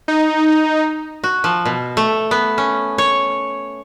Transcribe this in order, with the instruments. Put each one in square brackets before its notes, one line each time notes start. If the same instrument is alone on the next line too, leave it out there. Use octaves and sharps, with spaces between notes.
[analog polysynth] D#4
[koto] F#4
F3
B2
A3
B3
C#4
C#5